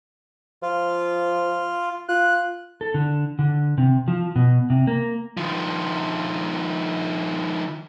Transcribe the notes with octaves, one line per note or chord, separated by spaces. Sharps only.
F3 F4
F4 F#6
A4
D3
D3
C3
F3
B2
C3
A#3
D#3 F3